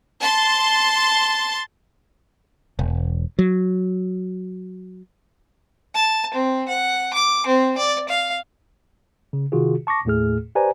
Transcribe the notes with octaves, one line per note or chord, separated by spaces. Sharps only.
A5 C6 A6
E1
F#3
A5
C4
F#5
D6
C4
D5
F5
C#3
C3 D#3 F4 F#4 G#4
A5 C#6 D6 A#6
D#2 A2 A3 G#4 F6
G4 B4 C5 D5 G#5 A#5